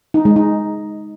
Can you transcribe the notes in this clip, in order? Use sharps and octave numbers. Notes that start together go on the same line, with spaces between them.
D#4
G#3
D#4